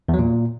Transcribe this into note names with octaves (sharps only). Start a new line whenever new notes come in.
E2
F#3
A#2